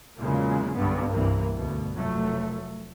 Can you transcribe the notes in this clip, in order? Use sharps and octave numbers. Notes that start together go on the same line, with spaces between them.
E2 A#2 C#3 F#3 G#3 A#3
B1 G2 D3 B3
C2 G2 C3 E3 A#3
D2 G2 B2
F1 F#3 A3